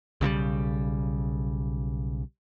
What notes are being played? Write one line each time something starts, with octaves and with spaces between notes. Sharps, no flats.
B1 C#3 F3 G3